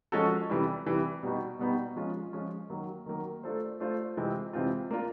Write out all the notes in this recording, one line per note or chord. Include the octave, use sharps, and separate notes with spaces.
F3 G#3 C#4 F#4 A4
C3 E3 G3
C3 E3 G3
B2 G3 B3 D#4 F#4
B2 G3 B3 D#4 F#4
F3 G#3 C#4 F4
F3 G#3 C#4 F4
D#3 F#3 A#3
D#3 F#3 A#3
A3 D4 F4 A4 C5
A3 D4 F4 A4 C5
C3 E3 G#3 C4 F4
C3 E3 G#3 C4 F4
A#3 D4 F4